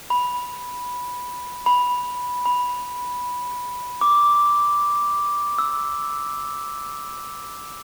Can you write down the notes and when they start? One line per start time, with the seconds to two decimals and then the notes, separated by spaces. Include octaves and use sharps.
0.10 B5
1.66 B5
2.46 B5
4.01 D6
5.58 E6